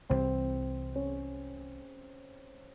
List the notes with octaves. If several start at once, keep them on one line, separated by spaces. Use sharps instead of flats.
C2 C3 E3 G3 C4
C#4